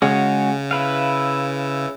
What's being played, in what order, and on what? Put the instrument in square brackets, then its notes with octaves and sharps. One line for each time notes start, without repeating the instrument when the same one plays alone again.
[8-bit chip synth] C#3 [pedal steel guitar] G#3 C#4 F#4
[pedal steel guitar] E4 B4 F5